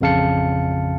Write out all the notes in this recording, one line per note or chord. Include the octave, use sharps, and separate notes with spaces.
A1 F2 C#3 F5 A5 C#7